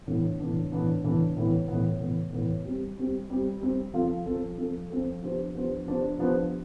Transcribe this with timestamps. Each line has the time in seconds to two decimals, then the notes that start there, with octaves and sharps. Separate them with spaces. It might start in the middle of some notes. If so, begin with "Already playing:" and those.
0.07 A2 E3 B3 D4
0.40 A2 E3 B3 D4
0.72 A2 E3 B3 D4
1.04 A2 E3 B3 D4
1.36 A2 E3 B3
1.68 A2 E3 B3
2.01 A2 E3 B3
2.33 A2 E3 B3
2.65 G3 C4 G4
2.97 G3 C4 G4
3.30 G3 C4 G4
3.62 G3 C4 G4
3.94 F3 C4 F4 A4
4.26 F3 C4 F4 A4
4.58 F3 C4 F4 A4
4.90 F3 C4 F4 A4
5.22 F3 B3 D4 G4 C5
5.55 F3 B3 D4 G4 C5
5.86 F3 B3 D4 G4 C5
6.19 F3 B3 D4 G4 C5